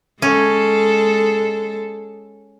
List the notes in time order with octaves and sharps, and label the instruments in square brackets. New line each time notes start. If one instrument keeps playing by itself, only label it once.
[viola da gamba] G#3 A4 [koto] C#4